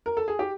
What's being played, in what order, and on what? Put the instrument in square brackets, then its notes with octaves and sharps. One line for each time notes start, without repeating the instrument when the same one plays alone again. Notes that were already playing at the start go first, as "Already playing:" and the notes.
[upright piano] A#4
A4
G#4
G4